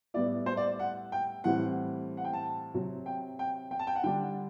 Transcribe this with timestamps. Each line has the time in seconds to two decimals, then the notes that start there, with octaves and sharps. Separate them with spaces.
0.14 A2 G3 B3 E4 D5
0.46 C5
0.57 D5
0.79 F#5
1.12 G5
1.44 A2 E3 G3 C4 F#5
2.17 F#5
2.25 G5
2.33 A5
2.74 C3 F#3 C4
3.06 G5
3.39 G5
3.71 G5
3.79 A5
3.87 G5
3.96 F#5
4.04 D3 G3 D4 G5